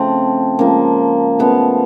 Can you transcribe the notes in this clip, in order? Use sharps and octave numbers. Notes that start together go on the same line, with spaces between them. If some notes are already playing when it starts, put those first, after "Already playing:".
Already playing: C#3 F3 A3 C4
C#3 F3 G#3 A#3
C#3 F3 A3 B3